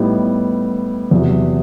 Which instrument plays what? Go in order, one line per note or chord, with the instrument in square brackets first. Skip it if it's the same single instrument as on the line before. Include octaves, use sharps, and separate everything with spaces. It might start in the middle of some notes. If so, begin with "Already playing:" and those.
Already playing: [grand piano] A2 G3 B3 D#4
E2 C3 F#3